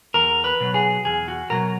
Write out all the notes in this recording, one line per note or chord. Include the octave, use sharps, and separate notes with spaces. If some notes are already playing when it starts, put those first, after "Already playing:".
E2 A#4
B4
B2 F#3
G#4
E2 G#4
F#4
B2 F#3 A#4